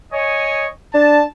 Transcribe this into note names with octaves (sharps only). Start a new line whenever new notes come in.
C#5 D#5 G#5
D4 A5